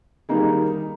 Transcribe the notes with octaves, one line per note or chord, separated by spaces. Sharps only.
D#3 G3 A#3 D#4 G#4